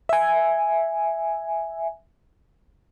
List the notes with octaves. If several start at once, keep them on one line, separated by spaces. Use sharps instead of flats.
E5 G#5